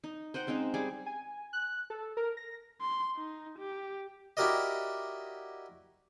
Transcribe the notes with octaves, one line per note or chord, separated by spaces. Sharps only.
D#4
C5 D#5 F#5 G5
G#3 C4 C#4 D#4
G3 G#4 D6
G#5
F#6
A4
A#4
A#6
C6
D#4
G4
E4 F#4 G4 A#4 D5 D#5